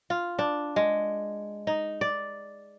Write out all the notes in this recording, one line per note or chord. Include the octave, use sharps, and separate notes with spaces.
F4
D4
G#3
D#4
D5